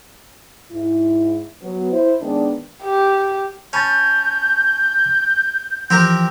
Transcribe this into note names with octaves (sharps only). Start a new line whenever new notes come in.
G#2 E4
F#3 B3
E4 C5
D#3 G#3 B3 D4
G4
C#4 A5 B5 G6 A6
E3 F3 C4 G4 A#4